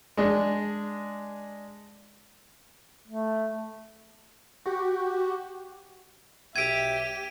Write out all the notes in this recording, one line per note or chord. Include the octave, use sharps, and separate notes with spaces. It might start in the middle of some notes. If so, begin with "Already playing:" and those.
G#3 D4
A3
F#4 G4
B1 G4 E5 G#6 D7 D#7